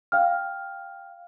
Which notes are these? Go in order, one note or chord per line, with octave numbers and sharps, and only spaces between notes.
F5 G5 F6